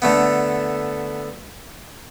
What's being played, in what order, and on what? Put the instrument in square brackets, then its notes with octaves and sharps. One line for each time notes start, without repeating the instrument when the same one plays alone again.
[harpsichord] D3 A3 B3